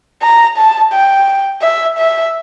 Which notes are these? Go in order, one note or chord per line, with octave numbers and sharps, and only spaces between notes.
A#5
A5
G5
E5
E5